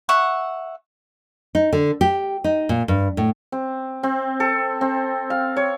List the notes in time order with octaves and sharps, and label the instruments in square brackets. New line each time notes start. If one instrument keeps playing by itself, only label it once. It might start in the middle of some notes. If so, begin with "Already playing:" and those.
[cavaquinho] E5 F#5 C#6
[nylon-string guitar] D#4
D3
G4
D#4
A#2
G2
A2
[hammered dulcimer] C4
C4
A4
C4
F5
C#5